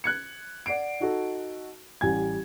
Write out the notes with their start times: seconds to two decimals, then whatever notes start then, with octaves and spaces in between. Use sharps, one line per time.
0.04 F#6 G#6 C#7
0.66 D5 F#5 C7 D7
1.00 D#4 F#4 A4
2.01 A1 G3 G#5 G#6